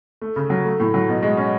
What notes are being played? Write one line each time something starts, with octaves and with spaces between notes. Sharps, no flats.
A3
C#3
F#3
A3
A2
F#3
B2
G#3
C#4